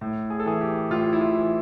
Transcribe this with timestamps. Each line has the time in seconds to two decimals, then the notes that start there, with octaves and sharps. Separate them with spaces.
0.01 A2
0.30 G#4
0.40 A4
0.46 E3 G#4
0.61 G4
0.90 A2 F4
1.13 E4
1.21 F4
1.35 E3